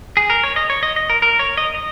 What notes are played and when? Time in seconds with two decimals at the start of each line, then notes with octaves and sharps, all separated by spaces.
0.17 G#4
0.30 A#4
0.44 C#5
0.56 D#5
0.70 C#5
0.83 D#5
0.96 D#5
1.10 A#4
1.22 A#4
1.39 C#5
1.57 D#5
1.75 D#5